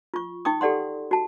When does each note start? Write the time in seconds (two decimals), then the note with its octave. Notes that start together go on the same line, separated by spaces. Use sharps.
0.14 F4 C#6
0.45 D#4 G5 C#6 D#6
0.61 G4 A4 D5 F#5 C6
1.11 F#4 A5